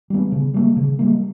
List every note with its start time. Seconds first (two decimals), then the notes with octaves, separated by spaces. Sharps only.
0.10 G3 B3
0.32 C#3
0.54 G3 A#3
0.77 C#3
0.99 G3 A#3